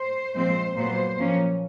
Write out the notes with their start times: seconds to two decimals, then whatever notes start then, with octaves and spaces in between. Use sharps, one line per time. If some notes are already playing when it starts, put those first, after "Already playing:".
Already playing: C5
0.34 A#2 F3 G#3 C4 C5
0.75 A#2 F#3 B3 C5
1.17 A#2 F3 A#3 C#4